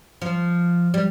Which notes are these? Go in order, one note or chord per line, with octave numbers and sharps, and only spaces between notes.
F3
G3